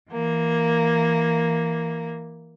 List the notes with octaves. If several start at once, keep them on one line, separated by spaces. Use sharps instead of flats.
E3 A#3